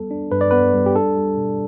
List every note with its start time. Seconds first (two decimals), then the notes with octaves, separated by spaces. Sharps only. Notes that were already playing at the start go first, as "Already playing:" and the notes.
Already playing: G3 B3 A4
0.11 D4
0.32 G2 B4
0.41 D5
0.51 B3 B4
0.74 G3
0.86 G4
0.95 D4 A4
1.17 G3
1.37 B2